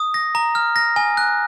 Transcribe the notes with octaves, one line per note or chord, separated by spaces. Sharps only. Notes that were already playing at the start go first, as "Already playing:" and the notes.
Already playing: D#6
A#6
A#5
F6
A#6
G#5
F#6